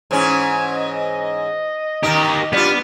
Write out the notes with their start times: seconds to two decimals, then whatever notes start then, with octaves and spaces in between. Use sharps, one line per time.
0.11 G#2 E3 C#4
0.72 D#5
2.03 D#3 D#4 G4 A#4
2.53 G3 B3 D4 F4